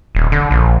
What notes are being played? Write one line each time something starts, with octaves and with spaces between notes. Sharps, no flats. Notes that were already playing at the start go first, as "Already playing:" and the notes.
D#1
D3
A#1